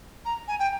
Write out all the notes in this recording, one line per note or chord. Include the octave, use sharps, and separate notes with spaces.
A#5
G#5
G5